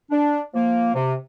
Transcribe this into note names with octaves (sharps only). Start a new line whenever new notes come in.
D4
F3 A#3
C3